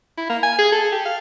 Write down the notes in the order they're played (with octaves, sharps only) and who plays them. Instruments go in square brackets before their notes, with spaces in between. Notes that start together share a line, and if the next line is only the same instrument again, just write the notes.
[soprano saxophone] E4
A#3
G#5
G#4
A4
G4
F5